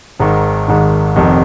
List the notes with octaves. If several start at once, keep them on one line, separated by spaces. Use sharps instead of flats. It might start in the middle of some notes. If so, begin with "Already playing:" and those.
G#1 G#2 D#3
G#1 G#2 D#3
F1 F2 C3 D#3